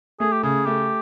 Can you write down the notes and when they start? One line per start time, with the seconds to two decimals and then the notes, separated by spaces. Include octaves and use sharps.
0.20 A3 G#4
0.33 G4
0.43 C#3 G#4
0.66 A3 G4